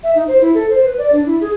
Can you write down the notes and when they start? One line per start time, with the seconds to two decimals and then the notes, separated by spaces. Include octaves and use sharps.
0.04 E5
0.15 D#4
0.28 C5
0.41 E4
0.55 A4
0.70 C5
0.85 B4
0.98 D5
1.12 D4
1.26 E4
1.41 G#4